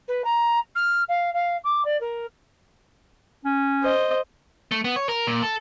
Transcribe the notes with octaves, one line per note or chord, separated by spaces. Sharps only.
B4
A#5
F6
F5
F5
D6
D5
A#4
C#4
C5 D#5
A3
B3
C#5
A#4
A#2
A4